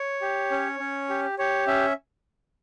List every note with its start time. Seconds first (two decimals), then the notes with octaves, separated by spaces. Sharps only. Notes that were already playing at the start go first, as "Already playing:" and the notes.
Already playing: C#5
0.21 G4
0.51 C#4
0.80 C#4
1.09 G4
1.38 G4 C#5
1.67 C#4 E5